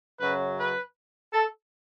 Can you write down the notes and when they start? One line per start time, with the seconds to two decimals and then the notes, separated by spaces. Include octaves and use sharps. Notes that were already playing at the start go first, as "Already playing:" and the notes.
0.19 F#2 C#3 F#3 B4
0.58 B4
1.33 A4